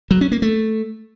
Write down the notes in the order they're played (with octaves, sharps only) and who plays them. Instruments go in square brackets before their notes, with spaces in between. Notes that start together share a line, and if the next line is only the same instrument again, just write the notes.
[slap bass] F#3
C#4
A#3
A3